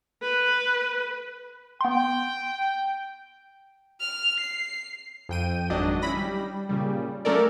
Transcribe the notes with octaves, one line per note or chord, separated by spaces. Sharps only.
B4
B3 G5 C6
F6
C7
F2 G5 D#7
G#1 F#3 D4 D#5
C#4 E4 B5 A#6
G3
A#2 C#3 G3
F#3 A3 C#4 A4 A#4 D5